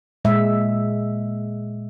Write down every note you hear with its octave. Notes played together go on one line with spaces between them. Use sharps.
A#2 G#3 E5